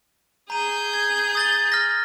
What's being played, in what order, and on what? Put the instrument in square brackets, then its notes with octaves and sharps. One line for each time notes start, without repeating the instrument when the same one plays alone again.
[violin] G#4 G6 [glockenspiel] A#5 D#7
[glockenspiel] G#6
D#6 A6 G7
F6 A#6